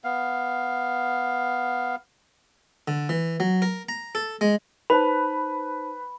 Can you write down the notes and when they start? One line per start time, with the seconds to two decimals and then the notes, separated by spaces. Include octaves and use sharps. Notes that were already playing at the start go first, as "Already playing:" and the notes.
0.04 B3 F5
2.88 D3
3.09 E3
3.40 F#3
3.62 A#4
3.89 A#5
4.15 A4
4.41 G#3
4.90 D#4 B4 C5 A5 B5